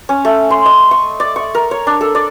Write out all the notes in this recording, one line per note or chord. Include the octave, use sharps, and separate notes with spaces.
C#4
A3
C6
D#5
C#6
D5
C#6
A#4
C#5
D4
A4
D5